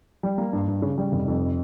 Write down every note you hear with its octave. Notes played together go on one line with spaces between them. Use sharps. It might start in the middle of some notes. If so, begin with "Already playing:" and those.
G3
A#3
G2
G2
C#3
G3
F1
F2